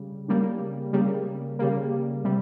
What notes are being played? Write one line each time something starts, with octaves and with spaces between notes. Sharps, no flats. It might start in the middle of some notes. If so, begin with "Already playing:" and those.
Already playing: C#3 G3
C#3 G3 A#3
C#3 G3 A#3
C#3 G3 A#3
C3 G3